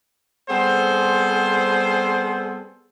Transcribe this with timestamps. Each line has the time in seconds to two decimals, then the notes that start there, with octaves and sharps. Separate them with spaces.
0.50 G3 B3 C4 G#4 A4 C5